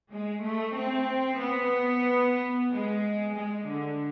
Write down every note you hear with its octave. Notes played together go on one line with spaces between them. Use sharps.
G#3
A3
C4
B3
G#3
G#3
D3